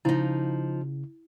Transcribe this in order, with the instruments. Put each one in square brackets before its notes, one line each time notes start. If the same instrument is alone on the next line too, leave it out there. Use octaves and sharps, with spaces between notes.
[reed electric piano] C#3 [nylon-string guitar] F3 D#4 [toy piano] E4